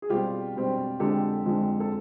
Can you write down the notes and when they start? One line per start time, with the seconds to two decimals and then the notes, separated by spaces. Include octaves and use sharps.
0.02 G#4
0.09 B2 G3 C4 F4 G4
0.55 B2 G3 C4
1.00 F2 D3 F3 G#3 G4 A4
1.45 F2 D3 F3 G#3
1.80 A4